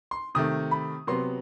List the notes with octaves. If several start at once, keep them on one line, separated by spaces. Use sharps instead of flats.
C6
C3 D#3 A3 D#6
B5
C3 F#3 B3 C6